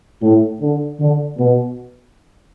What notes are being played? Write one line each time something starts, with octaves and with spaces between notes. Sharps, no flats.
A2
D3
D3
B2